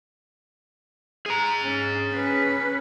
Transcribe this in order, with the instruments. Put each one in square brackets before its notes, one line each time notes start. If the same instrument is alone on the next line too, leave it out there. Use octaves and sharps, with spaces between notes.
[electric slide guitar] G#4 A#5
[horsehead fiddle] C#4
C#4 B4